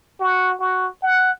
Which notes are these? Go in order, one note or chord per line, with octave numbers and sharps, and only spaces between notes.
F#4
F#4
F#5